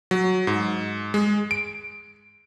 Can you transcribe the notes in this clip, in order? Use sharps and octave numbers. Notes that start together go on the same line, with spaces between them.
F#3
G#2
G#3
D7